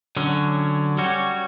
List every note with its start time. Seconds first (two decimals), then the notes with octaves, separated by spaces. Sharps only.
0.17 D3 F#3 C#4
0.98 G3 C#4 F#4 C#5